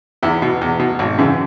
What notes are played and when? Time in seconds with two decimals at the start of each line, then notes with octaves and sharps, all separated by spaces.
0.23 E2 E4
0.42 B2
0.61 E2
0.79 B2
0.99 G#1
1.18 F#2 C#3 E3